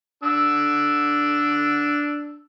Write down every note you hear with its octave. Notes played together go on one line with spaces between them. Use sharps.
D4 E6